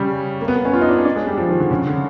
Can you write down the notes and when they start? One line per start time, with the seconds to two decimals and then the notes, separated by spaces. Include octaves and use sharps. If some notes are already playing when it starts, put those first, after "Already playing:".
Already playing: C#3 G3
0.41 A#3
0.48 B3
0.65 C#4
0.73 F4
0.81 D#4
0.89 D4
0.98 C#4
1.05 D4
1.16 G#3
1.27 G3
1.38 F3
1.48 D#3
1.60 D3
1.71 C#3
1.87 D3